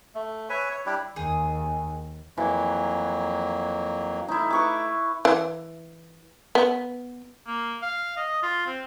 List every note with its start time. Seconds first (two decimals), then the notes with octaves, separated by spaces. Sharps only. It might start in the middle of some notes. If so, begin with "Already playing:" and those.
0.15 A3
0.50 B4 C#5 E5 G#5
0.71 C#5
0.86 G3 D4 E4 G4
1.16 D#2 G#4
2.38 F2 E3 F#3 A#3
4.28 A3 D#4 E4
4.50 B4 C#6 D6
5.25 E3
6.55 B3
7.47 A#3
7.82 F5
8.17 D#5
8.43 F4
8.67 C4